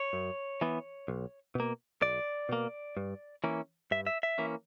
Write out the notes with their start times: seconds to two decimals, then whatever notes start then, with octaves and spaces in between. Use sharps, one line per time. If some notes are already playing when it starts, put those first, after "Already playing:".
Already playing: C#5
0.13 F#2
0.61 E3 B3
1.08 B1
1.55 B2 A#3
2.02 B1 D5
2.49 B2 A#3
2.97 G2
3.44 E3 A#3 C#4
3.91 G2 E5
4.07 E5
4.23 E5
4.38 E3 A#3 C#4